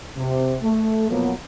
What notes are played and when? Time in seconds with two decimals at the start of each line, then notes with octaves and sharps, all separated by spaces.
0.17 C3
0.63 A3
1.10 B2 F3 F#3 A#3 B3